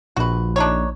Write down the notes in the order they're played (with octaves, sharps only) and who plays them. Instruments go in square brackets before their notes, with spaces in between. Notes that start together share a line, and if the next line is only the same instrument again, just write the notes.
[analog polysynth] A#1 [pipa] F#4 B4
[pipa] D4 D#4 C#5